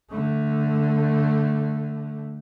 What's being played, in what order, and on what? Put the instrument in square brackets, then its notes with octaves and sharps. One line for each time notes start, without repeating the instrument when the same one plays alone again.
[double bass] D3 A3